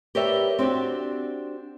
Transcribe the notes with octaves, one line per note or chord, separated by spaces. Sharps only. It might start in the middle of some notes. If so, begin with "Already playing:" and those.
G4 A#4 B4 C#5 D5 E5
C4 D4 F#4 G4